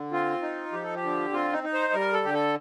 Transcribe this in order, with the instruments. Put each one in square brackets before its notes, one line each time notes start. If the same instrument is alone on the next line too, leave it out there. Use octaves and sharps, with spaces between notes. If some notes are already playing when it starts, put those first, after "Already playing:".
Already playing: [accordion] D3
C4 F4
D#4
F3 G4
A4
G4
D3
C4 F4
D#4
D#4
C5
G3 A#4
A4
D3 G4
A4